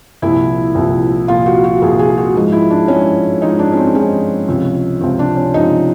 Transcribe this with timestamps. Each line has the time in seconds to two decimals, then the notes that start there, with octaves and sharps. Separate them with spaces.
0.22 C2 A#2 F3 E4
0.75 C2 A#2 F3
1.28 C2 A#2 F3 F4
1.46 F#4
1.64 F#4
1.82 C2 A#2 F3 G#4
1.99 G#4
2.17 F#4
2.35 G#2 F3 G#3
2.52 E4
2.70 D4
2.88 G#2 F3 G#3 C#4
3.41 G#2 F3 G#3 D#4
3.59 D4
3.72 C#4
3.77 C4
3.95 G#2 F3 G#3 C#4
4.48 C#2 C3 F3
5.01 C#2 C3 F3 C4
5.19 D4
5.37 C#4
5.54 C#2 C3 F3 D#4